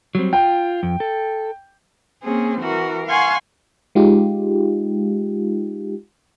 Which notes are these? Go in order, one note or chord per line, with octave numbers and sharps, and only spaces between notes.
F#3 G3 C4
F4 G5
F2
A4
A#3 C4 C#4 G#4
E3 F#4 A#4
F5 F#5 G#5 C6 C#6
G#3 D#4 F4 G4